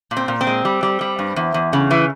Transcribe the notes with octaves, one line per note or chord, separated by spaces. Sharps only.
A#2
C4
A#2
C4
G#3
G3
G3
G3
G2
E2
E2
C#3
E3